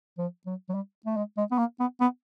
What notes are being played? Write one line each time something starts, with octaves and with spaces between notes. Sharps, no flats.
F3
F#3
F#3
G3
A3
G#3
G#3
B3
A#3
B3
B3